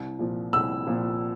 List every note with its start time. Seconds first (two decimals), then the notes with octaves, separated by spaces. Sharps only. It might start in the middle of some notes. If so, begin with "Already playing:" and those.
Already playing: C2
0.19 A#2 F3
0.53 C2 E6
0.87 A#2 F3